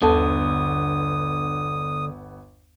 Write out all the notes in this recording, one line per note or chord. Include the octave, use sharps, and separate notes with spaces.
G1 D#2 D3 B3 A4 A5 D#6